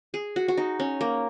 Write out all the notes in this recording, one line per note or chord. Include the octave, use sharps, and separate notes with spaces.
G#4
F#4
F#4
D#4
C#4
A#3